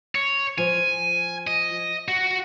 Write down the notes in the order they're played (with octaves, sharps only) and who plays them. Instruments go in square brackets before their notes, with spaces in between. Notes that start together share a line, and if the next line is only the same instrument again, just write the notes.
[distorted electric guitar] C#5
[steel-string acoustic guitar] F3 [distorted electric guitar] G#5
[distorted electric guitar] D#5
F#4